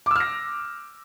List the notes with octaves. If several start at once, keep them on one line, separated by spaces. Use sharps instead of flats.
D6 E6 F6 A#6